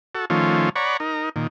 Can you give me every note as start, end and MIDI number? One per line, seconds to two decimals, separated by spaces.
0.15 0.25 66
0.15 0.25 69
0.30 0.69 51
0.30 0.69 53
0.30 0.69 57
0.30 0.69 61
0.30 0.69 65
0.76 0.97 73
0.76 0.97 74
0.76 0.97 78
0.76 0.97 82
0.76 0.97 83
0.76 0.97 85
1.00 1.29 63
1.00 1.29 70
1.36 1.47 46
1.36 1.47 51